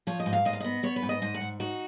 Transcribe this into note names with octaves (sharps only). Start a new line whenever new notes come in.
F3 C#5
D#5
G#2
F5
G#2 D#5
F5
B3 D#5
B3 C#5
B4
G#2
D#5
G#2 D#5
F#5
G#2
D#4 F#4